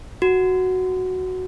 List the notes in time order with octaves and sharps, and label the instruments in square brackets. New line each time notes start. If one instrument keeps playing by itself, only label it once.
[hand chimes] F#4